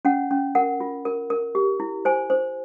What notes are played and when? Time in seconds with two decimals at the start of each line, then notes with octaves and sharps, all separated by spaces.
0.05 C#4 F#5
0.31 C#4
0.55 A#4 F#5
0.80 F4
1.05 A#4
1.30 A#4
1.55 G4
1.80 E4
2.05 C5 G#5
2.30 C5